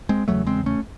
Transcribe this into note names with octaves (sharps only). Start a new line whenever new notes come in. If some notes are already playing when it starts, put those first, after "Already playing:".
G#3 C4
E2 C#3 F#3 A3
G#3 C4
A3 C#4